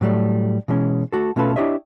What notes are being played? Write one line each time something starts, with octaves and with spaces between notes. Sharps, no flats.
A2 F#3 G3 A3
B2 E3 G#3 C#4
A3 F#4 A4
B2 A3 C#4 F4 A4 B4
D4 E4 G4 C#5 D#5 E5